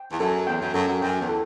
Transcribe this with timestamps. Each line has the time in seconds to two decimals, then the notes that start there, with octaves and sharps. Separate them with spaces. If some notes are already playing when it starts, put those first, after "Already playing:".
Already playing: G5
0.11 E2
0.20 F#2 A4
0.47 E2 G5
0.61 F#2
0.74 F#2 A4
0.88 F#2
1.02 F#2 G5
1.20 E2
1.29 A4